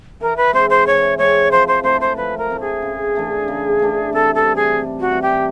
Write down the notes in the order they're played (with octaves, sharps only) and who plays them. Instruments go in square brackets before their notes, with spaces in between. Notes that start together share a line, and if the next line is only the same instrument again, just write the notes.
[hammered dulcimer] E3 [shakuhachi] A#4
[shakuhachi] B4
[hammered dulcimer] G#3 C4 [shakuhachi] C5
[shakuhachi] C5
[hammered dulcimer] E3 [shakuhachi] C#5
[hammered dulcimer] G#3 C4 [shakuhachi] C#5
[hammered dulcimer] F3 [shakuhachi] C5
[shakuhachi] C5
[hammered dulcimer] A3 C4 E4 [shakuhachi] C5
[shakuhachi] C5
[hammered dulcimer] F3 [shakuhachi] B4
[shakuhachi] A#4
[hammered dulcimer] A3 C4 E4
[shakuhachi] G#4
[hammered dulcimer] C#3
E3 A3 D4
C#3
E3 A3 D4
[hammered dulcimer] C3 [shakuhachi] A4
[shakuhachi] A4
[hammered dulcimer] E3 G3
[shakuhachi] G#4
[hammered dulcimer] C3
[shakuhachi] F#4
[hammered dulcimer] E3 G3
[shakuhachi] G4